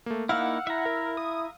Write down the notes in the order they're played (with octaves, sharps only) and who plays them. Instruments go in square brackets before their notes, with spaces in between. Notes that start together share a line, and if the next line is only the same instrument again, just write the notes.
[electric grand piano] A3 A#3
[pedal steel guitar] A#3 D#4 E4 [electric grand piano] F5 E6 F6 [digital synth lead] F#5
[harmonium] E4 [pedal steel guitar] E5 A#5
[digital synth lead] A#4
D#6